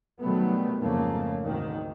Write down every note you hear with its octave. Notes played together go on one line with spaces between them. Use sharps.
C3 D#3 F#3 G3 A3 B3
F2 G#2 C#3 F3 A3 A#3
D2 G#2 C3 D#3